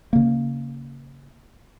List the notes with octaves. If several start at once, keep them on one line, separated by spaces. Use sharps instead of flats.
C#3 A#3